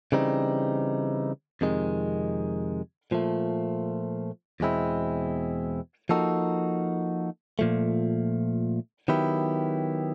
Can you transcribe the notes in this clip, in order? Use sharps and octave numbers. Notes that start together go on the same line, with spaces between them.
C#3 E3 G3 C4 D#4
F2 C3 D#3 G#3
A#2 F3 A3
E2 B2 G#3 C4 E4
F3 A#3 D#4 F#4 A4
A#2 F3 A3
D#3 F#3 B3 E4 G4